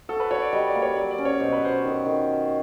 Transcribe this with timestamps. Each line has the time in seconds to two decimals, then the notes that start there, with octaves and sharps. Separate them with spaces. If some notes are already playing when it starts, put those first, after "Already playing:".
0.09 F#4 A4
0.20 B4
0.31 F#4 C#5
0.42 D5
0.53 G3 D#5
0.67 D5
0.75 A#3
0.82 C#5
0.96 F#3 D5
1.11 D5
1.18 C#4
1.25 C#5
1.40 B2 C5
1.52 B4
1.62 B2 C5
1.84 D#3
2.06 D#3